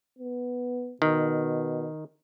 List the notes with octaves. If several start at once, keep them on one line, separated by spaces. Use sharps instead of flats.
B3
B2 D#3